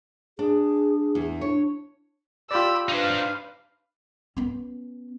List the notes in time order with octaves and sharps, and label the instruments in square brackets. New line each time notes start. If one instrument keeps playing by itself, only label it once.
[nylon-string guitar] D4 [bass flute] G#4
[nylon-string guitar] E2
[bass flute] D4 [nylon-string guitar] C#5
[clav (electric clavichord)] F4 D5 [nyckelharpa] G4 B5 [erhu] E6
[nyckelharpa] D4 B4 [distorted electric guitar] D#4 C5 [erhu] F5
[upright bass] B3 C#4